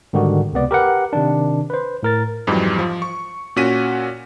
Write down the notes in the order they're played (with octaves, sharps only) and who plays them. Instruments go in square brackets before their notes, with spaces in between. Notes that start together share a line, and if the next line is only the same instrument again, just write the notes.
[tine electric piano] G#2 D3 D#3 G3 F#4
C#2 C3 B3 D5
G4 A#4 B4 F#5
C3 D#3 D4
B4 C5
A2 A#4 A6
[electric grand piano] F2 G#2 E3 F#3 G3
F3
C#6
A#2 C#4 F#4 F#5 B6 D#7